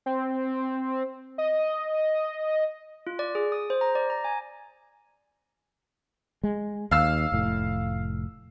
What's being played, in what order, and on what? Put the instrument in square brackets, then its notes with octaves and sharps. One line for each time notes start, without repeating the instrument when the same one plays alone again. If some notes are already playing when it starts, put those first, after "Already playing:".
[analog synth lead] C4
D#5
[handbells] F4
D5
G#4
D#6
C5
A#5
D5
A#5
G#5
[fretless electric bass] G#3
[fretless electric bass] D#2 [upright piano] F5 E6
[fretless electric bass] F1 A2